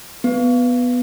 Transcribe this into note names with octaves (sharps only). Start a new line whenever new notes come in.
B3